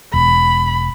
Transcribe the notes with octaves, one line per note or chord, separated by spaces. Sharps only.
E1 B5